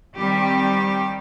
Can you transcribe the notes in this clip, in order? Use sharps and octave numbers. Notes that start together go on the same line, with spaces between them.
D#3 G3 C4 G4